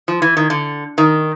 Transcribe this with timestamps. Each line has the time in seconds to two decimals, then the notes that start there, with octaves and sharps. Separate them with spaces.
0.08 F3
0.22 E3
0.37 D#3
0.50 D3
0.98 D#3